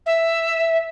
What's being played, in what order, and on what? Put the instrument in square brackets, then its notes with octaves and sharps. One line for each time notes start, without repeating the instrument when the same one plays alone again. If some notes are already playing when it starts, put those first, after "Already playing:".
[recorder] E5